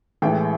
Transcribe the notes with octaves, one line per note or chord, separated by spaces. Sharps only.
A1 A2 E3 G#3 G5